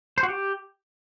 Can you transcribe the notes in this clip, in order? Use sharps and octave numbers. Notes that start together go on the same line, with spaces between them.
C5
F#4
G4